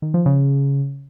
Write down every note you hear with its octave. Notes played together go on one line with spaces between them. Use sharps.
D#3
F3
C#3